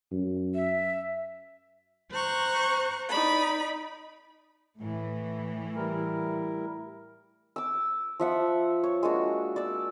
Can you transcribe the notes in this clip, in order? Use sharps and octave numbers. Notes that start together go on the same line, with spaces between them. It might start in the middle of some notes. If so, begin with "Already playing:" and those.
F#2
E5
C5 A#5 C#6 F#6
D#4 D5 B5
A2 E3
G3 E4 A#4
D6 E6
F3 E5 F#5
C#5
G#3 A#3 D4 F#4
D5 E6